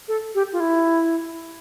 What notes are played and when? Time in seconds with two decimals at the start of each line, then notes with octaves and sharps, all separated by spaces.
0.08 A4
0.35 G4
0.53 F4
0.60 E4